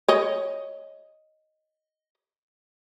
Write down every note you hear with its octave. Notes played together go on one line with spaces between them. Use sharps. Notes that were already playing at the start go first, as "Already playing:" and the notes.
C#5 D#5